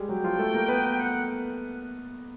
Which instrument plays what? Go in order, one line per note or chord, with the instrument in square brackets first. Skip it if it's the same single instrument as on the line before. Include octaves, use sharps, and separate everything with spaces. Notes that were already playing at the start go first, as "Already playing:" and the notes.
Already playing: [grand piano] G3 G#3 G4 G#4
[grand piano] F#3 F#4 [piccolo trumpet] G5
[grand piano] F3 F4
A3 A4
A#3 A#4
B3 B4
[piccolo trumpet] F#5